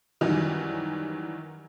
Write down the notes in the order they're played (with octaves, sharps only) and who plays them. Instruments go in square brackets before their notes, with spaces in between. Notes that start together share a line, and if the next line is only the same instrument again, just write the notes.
[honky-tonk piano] F#2 D#3 E3 F#3 G3